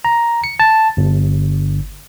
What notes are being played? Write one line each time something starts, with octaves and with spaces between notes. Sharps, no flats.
A#5
C#7
A5
G1